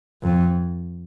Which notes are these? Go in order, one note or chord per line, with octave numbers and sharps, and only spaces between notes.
F2